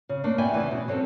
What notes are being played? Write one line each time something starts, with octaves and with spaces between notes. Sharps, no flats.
C#3
A3 A#3 D4
B3 G4 D5 E5 G5 G#5
E2 C#3 E3
B2
F#3 C4 C#4 A4